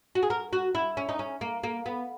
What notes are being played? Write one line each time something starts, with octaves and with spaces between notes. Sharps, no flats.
F#4
G#4
A#4
F#4
E4
C#4
D#4
C#4
A#3
A#3
B3